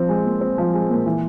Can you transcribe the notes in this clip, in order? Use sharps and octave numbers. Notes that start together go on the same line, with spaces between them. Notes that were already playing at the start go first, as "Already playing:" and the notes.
Already playing: F3 C4
G#3
A#2
C4
F3
G#3
A#2
E3